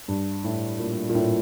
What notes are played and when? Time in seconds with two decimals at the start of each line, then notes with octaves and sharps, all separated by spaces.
0.08 G2
0.44 A2
0.79 A#2
1.09 A#2
1.15 A2